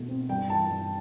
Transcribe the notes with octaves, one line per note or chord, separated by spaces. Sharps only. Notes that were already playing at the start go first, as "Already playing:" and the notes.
Already playing: B2 A3
C4
G2 G5
E3 A5
G2